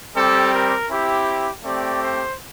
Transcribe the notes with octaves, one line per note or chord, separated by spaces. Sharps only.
G3 C4 G4 A4
A#4
C4 E4 G4
A3 C4 G4 D5
C5